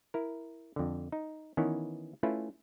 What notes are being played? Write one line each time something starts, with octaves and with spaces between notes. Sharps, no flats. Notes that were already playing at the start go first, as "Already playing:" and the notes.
E4 A#4
F2 D3
D#4
D#3 E3 B3 C#4 E4
A3 C#4 E4 F4 B4